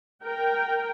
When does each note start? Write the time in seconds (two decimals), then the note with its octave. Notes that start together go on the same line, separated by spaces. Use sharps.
0.23 A#4 G5